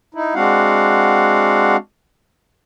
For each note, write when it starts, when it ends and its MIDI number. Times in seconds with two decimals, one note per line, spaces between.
0.14 0.34 63
0.14 0.34 64
0.35 1.76 56
0.35 1.76 60
0.35 1.76 62
0.35 1.76 66
0.35 1.76 77
0.35 1.76 78